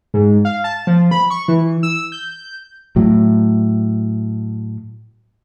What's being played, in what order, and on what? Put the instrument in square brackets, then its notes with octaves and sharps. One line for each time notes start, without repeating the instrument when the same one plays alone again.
[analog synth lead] G#2
F5
A5
F3
B5
C#6
E3
E6
G6
[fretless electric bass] A2 F#3